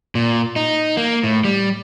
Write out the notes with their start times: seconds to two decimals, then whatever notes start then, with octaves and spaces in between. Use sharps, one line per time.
0.15 A#2
0.56 D#4
0.97 A#3
1.23 A2
1.44 G3